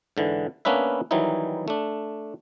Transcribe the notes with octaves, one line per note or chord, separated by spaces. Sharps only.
G#2 D3 E3
A#3 B3 C#4 D4 B4 E5
D#3 E3 F#3 G3 D#4 E4
A3 D4